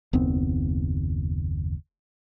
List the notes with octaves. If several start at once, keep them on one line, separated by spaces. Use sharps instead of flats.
F#1 D#2 B3 C4